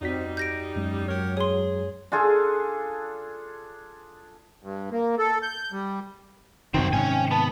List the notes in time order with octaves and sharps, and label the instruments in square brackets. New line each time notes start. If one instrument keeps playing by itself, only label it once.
[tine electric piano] F2 F#4 B6 [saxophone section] G3 D#4 [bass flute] C4
[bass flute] G4 [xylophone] G6 A#6 D7
[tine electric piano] F#2 G#3
[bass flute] F#3 [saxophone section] G4 A#4 C#5
[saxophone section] G#4 [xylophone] C#5 C6
[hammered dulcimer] D4 F4 G#4 A4
[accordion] G2
A#3
A4
G6
G3
[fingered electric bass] F#2 C3 D#3 [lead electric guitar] C4 F#4 [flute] G5
[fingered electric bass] G#2 C3 D#3 [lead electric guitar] C#4 G#5
[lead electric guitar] B3 [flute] A5